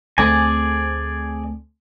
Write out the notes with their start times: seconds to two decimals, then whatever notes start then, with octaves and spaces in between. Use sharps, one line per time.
0.18 D2 A3 C4 G#4 D5 G#5